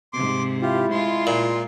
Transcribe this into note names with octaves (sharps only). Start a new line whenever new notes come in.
G#2 C3 C6 D6
E4 F4 G4
G#3 F4 C6
A#2